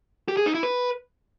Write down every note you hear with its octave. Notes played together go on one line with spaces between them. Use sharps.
G4
G#4
D#4
E4
B4